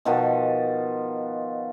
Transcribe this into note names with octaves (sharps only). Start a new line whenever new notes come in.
B2 D#3 F3 F#4